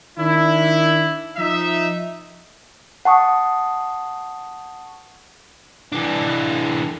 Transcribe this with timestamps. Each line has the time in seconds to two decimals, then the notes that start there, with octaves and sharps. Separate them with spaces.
0.18 D#3 D4 E4
1.37 F3 D#4 E5
3.05 F#5 A5 C#6 D#6
5.92 E3 D4